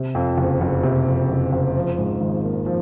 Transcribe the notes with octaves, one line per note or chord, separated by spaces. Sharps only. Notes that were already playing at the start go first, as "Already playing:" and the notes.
Already playing: C3
F2
F#1
F#1
C3
F2
F#1
F#1
F3
G#2
G#1
A#3
F3